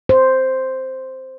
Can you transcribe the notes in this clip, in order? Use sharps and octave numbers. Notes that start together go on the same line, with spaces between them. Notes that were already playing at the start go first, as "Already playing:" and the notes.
C5